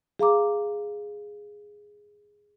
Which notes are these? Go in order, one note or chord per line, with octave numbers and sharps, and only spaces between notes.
G#4 F5 A#5 D6